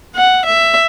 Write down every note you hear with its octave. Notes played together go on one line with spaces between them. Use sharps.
F#5
E5